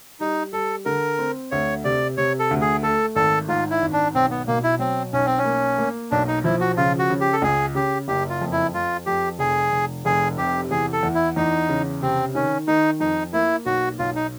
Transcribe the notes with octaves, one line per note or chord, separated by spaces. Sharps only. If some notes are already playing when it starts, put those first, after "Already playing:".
G3 D#4
G3 A4
D3 A#4
C4
D2 C#5
C3 D5
C3 C#5
A4
D2
G#4
A3 A4
G#1 A4
G#2 F4
E4
G#1
D4
B1 C4
B3
B2 A#3
E4
F#3 C4
B1 C#4
C4
C#4
A#3
A#3
B1 D4
D#4
F3 E4
F#4
C#3 F4
F#4
C#3
G4
A4
C#2 G#4
C#3 G4
F#1 G4
F4
F2
E4
F2 F4
F2 G4
F1 G#4
F1
F1 G#4
C3 G4
E2 G#4
A4
E2
E4
E2 D#4
C#3
C3 C4
D#3 C#4
D#3 D#4
F2 D#4
A#3 E4
B1 F#4
B1 F4
D#4